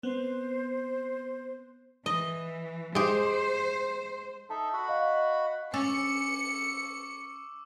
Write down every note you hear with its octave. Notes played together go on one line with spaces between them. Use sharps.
B3 C4 C5
E3 D#5
G#3 G4 C5
D#4 A4 E5 A5
F#4 F#5 B5
D#5 F5
C#4 C#6 D6 E6 C#7